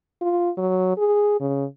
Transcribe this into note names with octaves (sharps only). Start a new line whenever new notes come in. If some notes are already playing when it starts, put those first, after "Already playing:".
F4
F#3
G#4
C#3